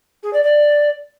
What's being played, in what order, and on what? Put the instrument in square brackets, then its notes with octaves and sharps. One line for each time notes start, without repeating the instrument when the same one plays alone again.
[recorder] G#4
D5
D5